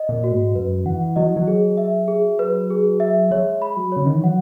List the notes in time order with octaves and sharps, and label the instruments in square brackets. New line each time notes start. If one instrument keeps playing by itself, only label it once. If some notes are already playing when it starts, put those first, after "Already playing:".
Already playing: [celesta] D#5
[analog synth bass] A#2
[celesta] F#4
[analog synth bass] G#2
[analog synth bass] F#2 [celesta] B4
[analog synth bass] E3 [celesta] F#5
[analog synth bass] F#3 [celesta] D#5
[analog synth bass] E3
F#3
[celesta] G#4
E5
G#4
B4
G#4
E5
[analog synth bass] G#3 [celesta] C#5
[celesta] B5
[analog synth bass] F#3
[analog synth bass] C#3 [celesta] C#5
[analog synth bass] D#3
E3
[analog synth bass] F#3 [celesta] F#5